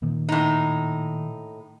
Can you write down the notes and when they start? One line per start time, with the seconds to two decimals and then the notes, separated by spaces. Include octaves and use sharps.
0.02 A#2 D#3 A#3
0.29 A2 D#4